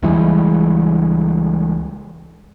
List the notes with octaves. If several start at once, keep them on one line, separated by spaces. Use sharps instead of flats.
C#2 E3 G3 G#3